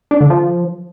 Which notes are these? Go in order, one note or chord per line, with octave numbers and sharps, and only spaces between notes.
D4
D3
F3